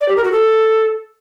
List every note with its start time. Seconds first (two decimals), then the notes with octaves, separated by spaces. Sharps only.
0.01 D5
0.09 G4
0.16 A#4
0.24 F#4
0.32 A4